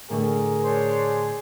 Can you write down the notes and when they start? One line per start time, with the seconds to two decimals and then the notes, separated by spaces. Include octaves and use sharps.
0.10 A2 D3 A3 G#4 A#4
0.63 D4 C5 C#5